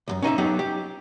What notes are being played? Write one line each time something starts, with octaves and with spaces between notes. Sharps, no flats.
C2 F#2
C#4 D#4 D#5 E5
F#3 B3 D#4 G4
G4